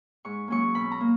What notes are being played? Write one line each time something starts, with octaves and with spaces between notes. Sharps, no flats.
G#2 C#6
F#3 A#3 C#4 C#6
B2 B5
A#5
A#3